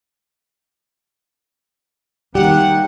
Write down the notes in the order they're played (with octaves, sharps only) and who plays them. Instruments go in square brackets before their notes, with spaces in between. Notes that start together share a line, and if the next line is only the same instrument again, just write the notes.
[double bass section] D#3 A#3 [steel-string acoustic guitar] G3 [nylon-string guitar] G4 [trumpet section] F#5